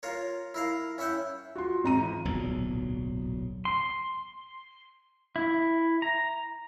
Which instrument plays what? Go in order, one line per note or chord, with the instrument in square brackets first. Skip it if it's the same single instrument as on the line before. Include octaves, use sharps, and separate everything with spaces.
[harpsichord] F4 A#4 C#5
E4 A#4 F5
C#4 E4 E5 F#5 G5
[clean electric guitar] F4 [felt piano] F#4 C6
[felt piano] G#1 A#5 D#7 [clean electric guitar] C4
[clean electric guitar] E3 E4 F4
[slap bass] D1 B1 A#2 F#3
[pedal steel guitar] C6
E4
A#5